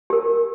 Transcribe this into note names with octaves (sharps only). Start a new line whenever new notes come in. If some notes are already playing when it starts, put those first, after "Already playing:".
G4 A#4